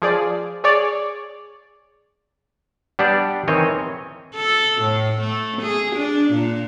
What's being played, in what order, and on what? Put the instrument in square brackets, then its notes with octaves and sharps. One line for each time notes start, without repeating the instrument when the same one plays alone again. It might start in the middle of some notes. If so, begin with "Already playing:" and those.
[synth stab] F3 G#4 D5
G#4 C#5 D5
[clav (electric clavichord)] G3 B3 D4 G4 D5
D#3 E3 C4 C#5 D#5
[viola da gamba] A4
A2
A3
G#4
D4
A#2